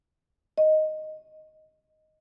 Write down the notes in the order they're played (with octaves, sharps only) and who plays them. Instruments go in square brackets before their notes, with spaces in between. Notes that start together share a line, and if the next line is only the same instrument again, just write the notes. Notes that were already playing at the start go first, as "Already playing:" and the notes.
[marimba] D#5